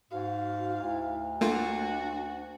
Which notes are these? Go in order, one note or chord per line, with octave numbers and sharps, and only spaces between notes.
G#2 F#4 F5
D2 E4
A3 A#3 D4 F4 F#4